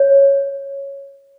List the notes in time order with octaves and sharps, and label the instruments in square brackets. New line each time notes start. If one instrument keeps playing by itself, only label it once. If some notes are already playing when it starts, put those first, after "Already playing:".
Already playing: [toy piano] C#5